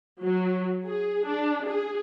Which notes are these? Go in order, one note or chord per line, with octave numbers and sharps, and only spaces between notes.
F#3
G#4
D4
G#4